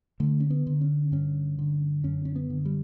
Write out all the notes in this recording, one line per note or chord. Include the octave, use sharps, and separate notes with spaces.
D3 A3
C#4
B3
D3
C#4
G2 C#4
D3
F#2 C#4
C#4
B3
D3
G3